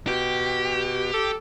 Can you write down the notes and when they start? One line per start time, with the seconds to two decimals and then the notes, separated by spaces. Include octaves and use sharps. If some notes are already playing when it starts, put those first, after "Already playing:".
0.07 B2 G4
1.14 A4